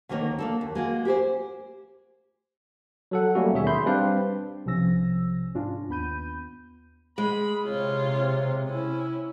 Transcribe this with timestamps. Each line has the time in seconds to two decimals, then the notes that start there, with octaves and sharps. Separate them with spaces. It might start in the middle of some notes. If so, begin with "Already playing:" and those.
0.09 D2 D#3 A#3 C#4 D#4 C#5
0.39 A#3 D4 A4
0.61 D#2
0.75 G#3 A#3 F#4
1.05 G4 G#4 B4 C5
3.11 F#3 A4 F#5
3.35 F#3 G3 A3 A#3 C#4 F#4
3.53 D#2 B2 D#3 G#4 E5
3.67 B5 C6 G6
3.86 G3 C4 D4 B4 D5 F5
4.66 B1 C3 F3 C#4 E6 A#6
5.55 G#2 C#4 D4 F4
5.89 D#2 B3 B5 G6 D#7
7.18 G#3 B5
7.64 C3 F4 C#5
8.67 C#4 E4